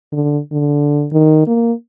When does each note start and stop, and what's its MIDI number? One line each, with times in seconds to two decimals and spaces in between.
0.13 0.38 50
0.52 1.07 50
1.12 1.47 51
1.47 1.72 58